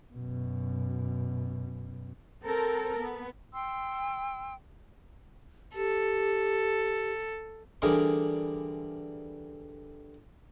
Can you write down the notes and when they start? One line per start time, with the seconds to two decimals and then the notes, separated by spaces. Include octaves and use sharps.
0.14 F#2 B2
2.44 C4 A4 A#4
2.99 B3
3.54 G5 C6 E6
5.75 G4 A4
7.82 D3 E3 G3 D4 G#4 A#4